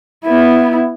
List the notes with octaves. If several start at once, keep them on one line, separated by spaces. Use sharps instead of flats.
B3 E4